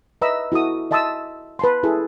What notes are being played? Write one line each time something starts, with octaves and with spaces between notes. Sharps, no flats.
B4 D#5 E5 A#5 B5 E6
E4 F#4 A4 D#6
D#5 E5 A5 C6 D#6 E6
B4 A5 C6
E4 G#4 A4